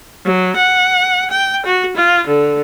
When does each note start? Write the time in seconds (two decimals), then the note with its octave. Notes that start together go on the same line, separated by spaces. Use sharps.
0.25 F#3
0.56 F#5
1.30 G5
1.66 F#4
1.96 F4
2.27 D3